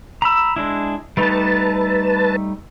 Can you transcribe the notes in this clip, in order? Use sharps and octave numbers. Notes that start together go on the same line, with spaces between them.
A#5 B5 E6
G#3 D4 E4
G3 A3 D#4 B4 A5